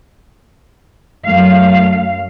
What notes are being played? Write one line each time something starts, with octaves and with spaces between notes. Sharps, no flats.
F#2 A3 F5